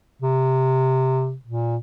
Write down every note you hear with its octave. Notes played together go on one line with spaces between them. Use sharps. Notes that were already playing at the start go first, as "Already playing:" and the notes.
C3
A#2